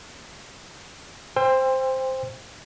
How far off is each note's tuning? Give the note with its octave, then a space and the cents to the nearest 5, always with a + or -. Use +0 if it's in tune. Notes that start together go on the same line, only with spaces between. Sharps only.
C5 +0 G5 +30 E6 +35